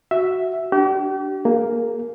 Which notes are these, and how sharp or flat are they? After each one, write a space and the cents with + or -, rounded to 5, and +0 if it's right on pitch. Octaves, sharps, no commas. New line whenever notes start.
F#4 +0 E5 +0
D4 +0 G4 -40
A#3 +0 G#4 +20